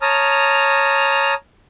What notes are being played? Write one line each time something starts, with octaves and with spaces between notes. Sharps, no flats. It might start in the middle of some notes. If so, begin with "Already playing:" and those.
C#5 A5 A#5 D#6 F6